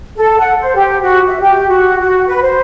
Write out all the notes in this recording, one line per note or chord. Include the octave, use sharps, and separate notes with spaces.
A4
F#5
C5
G4
F#4
E5
G4
F#4
F#4
B4
C5